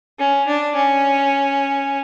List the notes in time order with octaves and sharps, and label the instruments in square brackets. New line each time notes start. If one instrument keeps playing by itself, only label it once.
[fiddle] C#4
D4
C#4